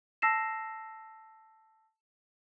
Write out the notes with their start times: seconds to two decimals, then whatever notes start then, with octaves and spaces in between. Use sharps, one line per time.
0.22 A5 E6 A#6 C7 E7